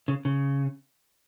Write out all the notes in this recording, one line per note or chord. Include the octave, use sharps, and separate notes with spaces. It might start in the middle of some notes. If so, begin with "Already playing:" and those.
C#3
C#3